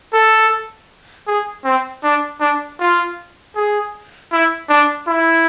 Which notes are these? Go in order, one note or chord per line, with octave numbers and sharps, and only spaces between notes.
A4
G#4
C4
D4
D4
F4
G#4
E4
D4
E4